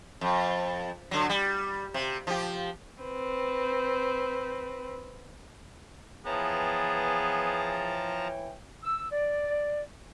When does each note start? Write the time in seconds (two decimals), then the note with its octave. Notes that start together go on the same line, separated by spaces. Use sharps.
0.21 F2
1.11 D3 F#3
1.29 G3
1.94 C3
2.27 F3 G4
3.03 C4 B4
6.25 E3 F3 B3 G#4 C#5 G5 A5 A#5
8.82 E6
9.12 D5